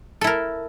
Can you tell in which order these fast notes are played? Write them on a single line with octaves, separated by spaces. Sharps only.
A4 E4 A#4